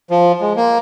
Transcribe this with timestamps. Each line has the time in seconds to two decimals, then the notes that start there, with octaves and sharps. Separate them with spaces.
0.10 F3
0.41 G#3
0.56 A#3